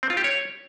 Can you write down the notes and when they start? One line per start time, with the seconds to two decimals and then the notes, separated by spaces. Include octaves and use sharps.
0.03 C4
0.10 F4
0.17 G4
0.24 C#5